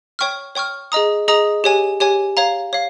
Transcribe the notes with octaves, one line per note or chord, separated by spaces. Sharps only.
C#5 G5 C#6 F6
C#5 G5 C#6 F6
G#4 D#5 A#5 D#6
G#4 D#5 A#5 D#6
G4 C#5 G#5
G4 C#5 G#5
C#5 F5 A#5
C#5 F5